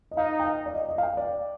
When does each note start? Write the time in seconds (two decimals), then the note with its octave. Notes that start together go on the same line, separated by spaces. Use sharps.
0.11 D#5
0.17 D#4 F5
0.40 G5
0.46 F5
0.66 D5
0.74 D#5
0.89 D#5
0.98 F5
1.03 G5
1.17 D5